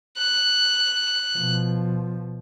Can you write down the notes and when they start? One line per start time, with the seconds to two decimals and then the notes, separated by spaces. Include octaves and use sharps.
0.17 F#6
1.36 B2 F3